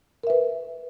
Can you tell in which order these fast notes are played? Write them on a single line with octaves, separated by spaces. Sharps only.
A#4 E5 B4